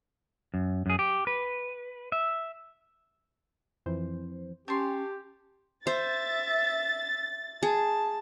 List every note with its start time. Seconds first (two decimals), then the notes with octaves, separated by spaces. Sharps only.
0.54 F#2
0.86 F#2 G#4
0.99 G4
1.27 B4
2.12 E5
3.86 F2 E3 C5
4.68 C#4 G4 C#5 G5 A5 C6
5.87 C5 E5 A6
7.63 G#4 A5